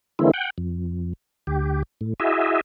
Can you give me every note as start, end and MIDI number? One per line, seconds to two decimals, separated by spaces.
0.19 0.31 50
0.19 0.31 52
0.19 0.31 56
0.19 0.31 58
0.19 0.31 60
0.19 0.31 64
0.34 0.50 78
0.34 0.50 79
0.58 1.13 41
1.47 1.83 38
1.47 1.83 67
2.01 2.14 45
2.20 2.61 64
2.20 2.61 66
2.20 2.61 68
2.20 2.61 75
2.20 2.61 76